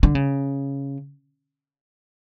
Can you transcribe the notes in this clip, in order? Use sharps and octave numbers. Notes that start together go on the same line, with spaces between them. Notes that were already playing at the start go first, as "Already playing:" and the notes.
D3
C#3